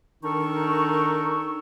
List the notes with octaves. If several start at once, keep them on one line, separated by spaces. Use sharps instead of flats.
D#3 D4 D#4 A4 A#4 C#6